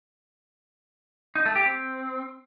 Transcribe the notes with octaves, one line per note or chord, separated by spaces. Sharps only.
D#4
A3
G4
C4